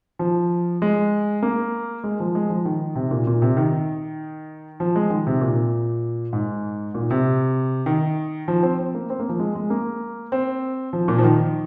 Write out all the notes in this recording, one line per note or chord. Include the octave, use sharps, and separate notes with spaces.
F3
G#3
A#3
G#3
F3
G#3
F3
D#3
C3
A#2
A#2
C3
D#3
F3
G#3
D#3
C3
A#2
G#2
A#2
C3
D#3
F3
C4
C4
A#3
C4
A#3
F3
G#3
G#3
A#3
C4
F3
A#2
F3
D#3